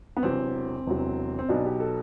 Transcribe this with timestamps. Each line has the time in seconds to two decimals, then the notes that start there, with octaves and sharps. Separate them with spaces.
0.17 B3
0.23 E1 E2 C3 F#3 C4
0.86 E1 E2 C3 F#3
1.39 C4
1.49 B1 B2 F#3 D4
1.65 G4
1.80 A4